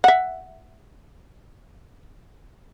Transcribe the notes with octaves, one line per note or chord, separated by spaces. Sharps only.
E5 F#5